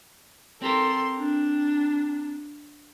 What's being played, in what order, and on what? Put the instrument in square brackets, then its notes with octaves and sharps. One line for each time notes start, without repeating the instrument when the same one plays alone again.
[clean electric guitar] C4 G4 A#4 [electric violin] A4 C6
[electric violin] D4